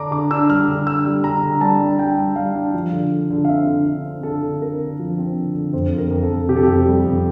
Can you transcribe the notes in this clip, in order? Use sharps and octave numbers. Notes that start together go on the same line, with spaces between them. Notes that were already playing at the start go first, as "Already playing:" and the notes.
Already playing: D3 D4 A#5 D6
D3 D6
D4 E6
G3 F6
D3
D3 E6
G3
D3 A#5
D3
G3 A5
D4
D4 G5
G3
G3 F5
D4
F3
D3
D3
D3
F5
C4 E5
D3
D3
C4
D3 A4
D3
C4 A#4
D3
F3
C4
D3
D3
F2 C5
F2
A#4
F2
A4
F2
C3 G4
A4
F2 G4
G3
F2